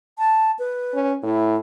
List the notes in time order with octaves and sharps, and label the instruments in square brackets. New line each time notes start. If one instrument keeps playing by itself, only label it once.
[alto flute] A5
B4
[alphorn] C#4
[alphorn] A2 [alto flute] E4